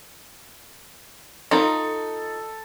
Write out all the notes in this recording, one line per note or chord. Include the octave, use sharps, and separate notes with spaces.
D#4 F4 A4 B5